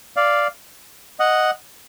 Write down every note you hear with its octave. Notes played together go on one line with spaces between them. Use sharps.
D5 F5
D#5 F#5